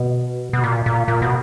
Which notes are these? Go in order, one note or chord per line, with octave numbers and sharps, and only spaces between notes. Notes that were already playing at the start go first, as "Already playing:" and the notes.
Already playing: B2
B2
A#2
A#2
A#2
B2